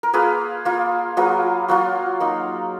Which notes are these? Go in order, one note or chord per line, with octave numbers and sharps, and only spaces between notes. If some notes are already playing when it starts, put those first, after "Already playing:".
A#4
A#3 F4 G#4 B4
A#3 F4
F#3 A#3 F4 G#4 B4
F#3 A#3 F4 F#4
A#3 D#4